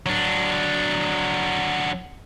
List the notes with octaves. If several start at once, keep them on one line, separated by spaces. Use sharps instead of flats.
F#3 D4